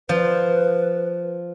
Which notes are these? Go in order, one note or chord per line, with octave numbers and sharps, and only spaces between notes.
F3 B4